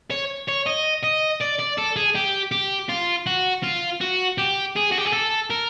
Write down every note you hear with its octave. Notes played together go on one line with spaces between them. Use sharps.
C#5
C#5
D#5
D#5
D5
D5
A4
G#4
G4
G4
F4
F#4
F4
F#4
G4
G#4
F#4
G4
G#4
A4
A#4